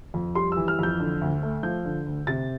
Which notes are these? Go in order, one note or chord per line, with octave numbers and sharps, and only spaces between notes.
F2
G3 C6
E3 E6
F6
F2 G6
D3
D2
A3
F3 G6
D3
D2
C3 A6